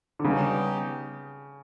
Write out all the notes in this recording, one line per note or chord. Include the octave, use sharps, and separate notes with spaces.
D3
C#3 G3 B3 D#4 G4